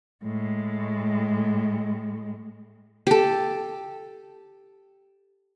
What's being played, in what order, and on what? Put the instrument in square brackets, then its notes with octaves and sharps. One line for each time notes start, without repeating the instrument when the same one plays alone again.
[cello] A2 G#3
[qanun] G4 A4